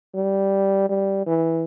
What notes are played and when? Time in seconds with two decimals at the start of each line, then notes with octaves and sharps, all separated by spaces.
0.15 G3
0.89 G3
1.26 E3